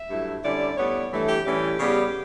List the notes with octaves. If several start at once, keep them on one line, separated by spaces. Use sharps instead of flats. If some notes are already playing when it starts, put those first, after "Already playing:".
Already playing: E5
G2 F#3 A3 E4
D3 G3 C#4 E4 D5
A2 G3 B3 C#5
G2 E3 A3
G4
A2 E3 G3 C#4 G4
C#3 G3 B3